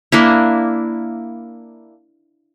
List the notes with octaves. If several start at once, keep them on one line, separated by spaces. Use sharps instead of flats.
A#3 D4 E4